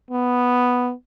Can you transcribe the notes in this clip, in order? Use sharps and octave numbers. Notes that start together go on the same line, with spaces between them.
B3